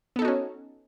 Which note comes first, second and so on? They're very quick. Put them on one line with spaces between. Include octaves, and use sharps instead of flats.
B3 A4 D#4 F#4 C#4